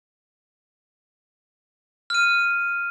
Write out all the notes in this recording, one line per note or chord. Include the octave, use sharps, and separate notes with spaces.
F6 D#7